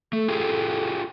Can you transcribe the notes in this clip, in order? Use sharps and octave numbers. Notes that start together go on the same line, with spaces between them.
A3 A4
F4 G4 G#4